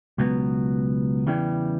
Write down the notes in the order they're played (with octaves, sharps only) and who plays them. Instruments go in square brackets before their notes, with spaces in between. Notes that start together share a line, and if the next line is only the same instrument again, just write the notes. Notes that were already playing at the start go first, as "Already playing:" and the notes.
[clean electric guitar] C#2 B2 F#3 B3
E2 C#3 E3 G3